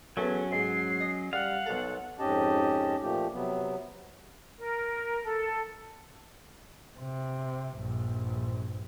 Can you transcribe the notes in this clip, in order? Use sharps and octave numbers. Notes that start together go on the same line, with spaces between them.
E2 F#3 A3 C#4
G#2 C7
D#5
G3 F5 F#5
B1 A4
F2 G#2 C#4 G4 D#5 A5
A#2 F3 A3 G4
C3 F#3 B3
A#4
A4
C3
A#1 G2